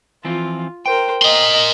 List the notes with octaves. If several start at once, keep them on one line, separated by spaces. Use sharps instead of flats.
E3 F3 C4 F4
A#4 C5 G5
A#4 D#5 A#5 C6